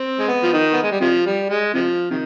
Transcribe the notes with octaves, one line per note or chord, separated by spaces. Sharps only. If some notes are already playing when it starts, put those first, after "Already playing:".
Already playing: C4
G#3
B3
F3
D#3
B3
G#3
G3
C3 F3
G3
G#3
C3 F3
C3 D#3